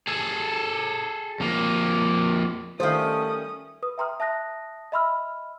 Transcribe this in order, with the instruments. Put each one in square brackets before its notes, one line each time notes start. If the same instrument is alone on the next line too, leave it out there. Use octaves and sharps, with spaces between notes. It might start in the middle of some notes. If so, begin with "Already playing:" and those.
[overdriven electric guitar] G#4 A4
F2 A#3
[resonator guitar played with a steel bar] D#3 G3 [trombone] A3 [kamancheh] C#4 D#6 [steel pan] C5 F5
[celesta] B4 D#6
E5 G5 A#5 C6 D#6 F6
E5 A5 D#6 F#6 A#6
D#5 E5 B5 C6 E6 F6